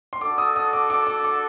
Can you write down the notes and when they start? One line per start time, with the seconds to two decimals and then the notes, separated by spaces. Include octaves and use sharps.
0.13 C6
0.21 D4 F#4 A4 D6
0.38 D#6
0.56 D#6
0.73 D6
0.90 D6
1.07 D6
1.24 D6